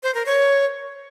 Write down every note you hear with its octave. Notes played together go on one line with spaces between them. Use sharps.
C5
A#4
C#5